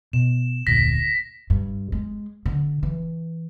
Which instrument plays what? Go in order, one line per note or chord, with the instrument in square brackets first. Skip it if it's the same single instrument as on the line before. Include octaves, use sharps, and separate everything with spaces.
[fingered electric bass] B2 [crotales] E7
[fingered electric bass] F1 D2 A#2 [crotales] A#6 B6
[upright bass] G2
G#3
D3
E3